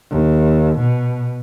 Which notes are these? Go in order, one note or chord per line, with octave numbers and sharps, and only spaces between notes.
D#2
B2